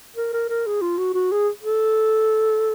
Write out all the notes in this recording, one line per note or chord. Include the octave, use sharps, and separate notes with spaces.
A#4
A#4
A#4
G#4
F4
F#4
F#4
G#4
A4